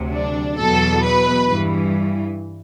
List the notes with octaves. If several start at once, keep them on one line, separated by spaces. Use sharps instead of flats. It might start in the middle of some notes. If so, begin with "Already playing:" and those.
Already playing: D2 C3 F#3
D4
E2 B2 F#3 A4
B4
G2 E3